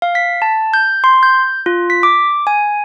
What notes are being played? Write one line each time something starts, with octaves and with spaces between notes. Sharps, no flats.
F5
B6
A5
G6
C6
G6
F4
B6
D6
G#5